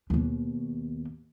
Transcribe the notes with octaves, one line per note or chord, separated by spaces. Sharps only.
D#2 B2